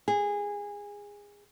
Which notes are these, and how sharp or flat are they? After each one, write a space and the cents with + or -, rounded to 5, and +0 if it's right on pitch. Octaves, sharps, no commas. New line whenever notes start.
G#4 -20